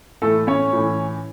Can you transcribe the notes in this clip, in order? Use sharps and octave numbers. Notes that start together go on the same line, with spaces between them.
A2 E3 A3 A4
C#4 C#5
A2 E3